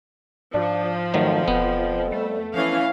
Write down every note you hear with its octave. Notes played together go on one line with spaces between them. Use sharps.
G#2 F3 D4
F2 D#3 F#3 A3
E1 B3
G3 A3
E3 F3 C#4 F5